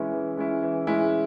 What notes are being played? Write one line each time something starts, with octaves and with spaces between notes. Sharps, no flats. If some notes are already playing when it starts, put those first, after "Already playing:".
Already playing: E3 G#3 C#4 E4
E3
G#3 C#4 E4
E3
G#3 C#4 E4